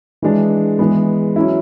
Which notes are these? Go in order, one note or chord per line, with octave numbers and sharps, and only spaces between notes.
E3 G#3 D4
E3 G#3 B3
F#3 C#4 E4